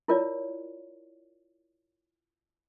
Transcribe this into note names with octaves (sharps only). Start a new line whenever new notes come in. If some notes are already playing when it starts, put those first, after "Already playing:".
E4 F4 A#4 C#5 D5